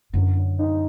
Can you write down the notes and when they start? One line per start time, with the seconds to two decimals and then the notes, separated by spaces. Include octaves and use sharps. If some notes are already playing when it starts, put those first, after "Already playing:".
0.13 F#2 D3
0.37 F#3
0.59 D#4